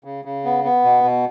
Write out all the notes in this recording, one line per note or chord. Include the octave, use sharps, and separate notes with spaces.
C#3
C#3
B3
B3
B2
B2